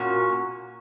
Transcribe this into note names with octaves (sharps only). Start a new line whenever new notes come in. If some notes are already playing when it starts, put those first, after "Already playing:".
Already playing: A#2 A#3 C#4 F#4